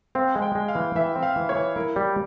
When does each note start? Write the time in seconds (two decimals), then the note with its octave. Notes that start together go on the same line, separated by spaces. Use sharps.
0.15 C4 F5
0.35 G#3
0.42 G5
0.55 G#3
0.68 F5
0.75 E3
0.95 E3 E5
1.15 C4
1.23 F5
1.36 E3
1.49 C#5
1.56 E3
1.76 E4 A#4
1.96 G3